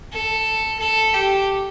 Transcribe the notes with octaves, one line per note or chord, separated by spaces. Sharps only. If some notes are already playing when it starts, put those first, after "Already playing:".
A4
A4
G4